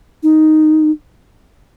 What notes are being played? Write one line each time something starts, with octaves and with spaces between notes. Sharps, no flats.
D#4